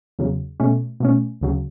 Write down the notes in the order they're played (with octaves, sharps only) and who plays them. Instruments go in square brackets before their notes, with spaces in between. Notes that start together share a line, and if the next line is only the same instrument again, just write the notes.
[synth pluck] E2 C#3 F#3
B2 A3 C#4
B2 A3 C#4
D2 C#3 F#3